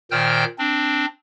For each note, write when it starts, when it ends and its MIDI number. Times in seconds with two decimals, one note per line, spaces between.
0.11 0.45 46
0.11 0.45 51
0.11 0.45 72
0.11 0.45 79
0.11 0.45 89
0.11 0.45 91
0.59 1.06 60
0.59 1.06 62